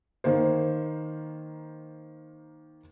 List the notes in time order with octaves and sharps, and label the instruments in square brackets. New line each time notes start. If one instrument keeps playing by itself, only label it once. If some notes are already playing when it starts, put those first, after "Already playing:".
[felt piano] D#3 A#3 C5